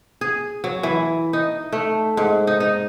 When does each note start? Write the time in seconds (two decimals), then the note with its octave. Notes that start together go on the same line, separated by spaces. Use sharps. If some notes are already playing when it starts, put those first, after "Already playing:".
0.21 G#4
0.64 F#3
0.83 E3
1.33 D#4
1.72 A3
2.17 G#2
2.47 D#4
2.60 D#4